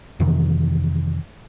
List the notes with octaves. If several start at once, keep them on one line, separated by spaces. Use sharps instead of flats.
F2 C3 D#3 E3